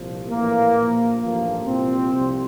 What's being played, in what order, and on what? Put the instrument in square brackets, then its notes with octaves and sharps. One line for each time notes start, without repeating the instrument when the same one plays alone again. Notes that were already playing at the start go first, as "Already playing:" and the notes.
Already playing: [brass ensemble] C2 A#2 F3
A#1 A2 E3 A#3
A#1 A#2 F3
A1 G2 F3 A#3
C2 A#2 F3 C4
C2 C3 F3